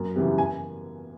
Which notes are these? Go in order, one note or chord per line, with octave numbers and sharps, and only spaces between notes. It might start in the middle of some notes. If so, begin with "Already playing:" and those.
Already playing: F#2
C#3 E3 G3 B3
G#5